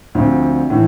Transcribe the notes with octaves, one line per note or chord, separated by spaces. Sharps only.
D2 D3 F3 C4
A2 E3